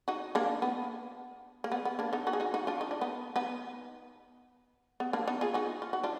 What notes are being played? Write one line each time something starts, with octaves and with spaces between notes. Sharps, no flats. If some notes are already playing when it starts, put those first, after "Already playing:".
D#4 F#4
A#3 D4
B3
A#3
B3
B3
A#3 D4
B3 D#4
D#4 F#4
G#4
D#4 F#4
D#4 F#4
D4 F4
D#4
D4
B3 D#4
B3 D#4
B3
A#3 D4
B3 D#4
F4 G#4
D#4 F#4
F4
F#4
D4 F4